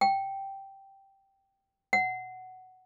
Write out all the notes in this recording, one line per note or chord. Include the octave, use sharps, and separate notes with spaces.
G5
F#5